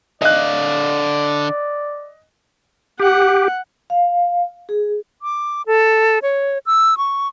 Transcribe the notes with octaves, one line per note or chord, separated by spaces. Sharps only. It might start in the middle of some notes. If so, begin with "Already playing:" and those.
D3 D5 D#5 F5 F#6
G4 F#5
F5
G#4
D6
A4
C#5
E6
C#6